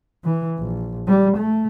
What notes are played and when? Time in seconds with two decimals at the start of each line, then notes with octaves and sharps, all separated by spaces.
0.24 E3
0.58 A#1
1.07 G3
1.37 A3